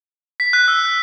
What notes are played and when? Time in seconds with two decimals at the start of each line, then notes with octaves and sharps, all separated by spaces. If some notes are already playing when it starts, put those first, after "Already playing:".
0.40 B6
0.53 F#6
0.68 E6